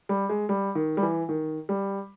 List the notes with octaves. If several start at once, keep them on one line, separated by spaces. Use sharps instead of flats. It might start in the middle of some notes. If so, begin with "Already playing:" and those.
G3
G#3
G3
D#3
G3
E3
D#3
G3